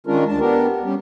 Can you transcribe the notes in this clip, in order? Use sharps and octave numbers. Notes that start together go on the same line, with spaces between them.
D#3 G#3 C#4 D4 F4 A#4
D2 D4 A5
B3 D4 G4 A#4
G3 C#4 G4